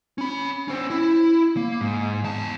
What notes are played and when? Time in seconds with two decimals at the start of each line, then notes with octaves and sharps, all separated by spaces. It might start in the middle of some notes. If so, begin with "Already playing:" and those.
0.18 C#4 B5
0.68 C#4 C5
0.90 E4
1.57 A#3
1.81 G#2
2.24 E2 A5